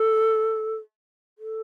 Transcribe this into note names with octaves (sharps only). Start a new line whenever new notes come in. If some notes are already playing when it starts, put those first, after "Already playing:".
Already playing: A4
A4